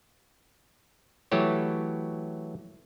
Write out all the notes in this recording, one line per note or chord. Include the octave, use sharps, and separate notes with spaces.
E3 F#3 A3 G4 C#5